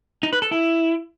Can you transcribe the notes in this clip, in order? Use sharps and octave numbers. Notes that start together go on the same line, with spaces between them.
D#4
B4
A4
E4